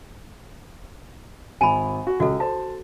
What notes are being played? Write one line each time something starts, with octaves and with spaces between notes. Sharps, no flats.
G#1 G#5 B5 D#7
F#4
C#2 F#4 A4
C5 A5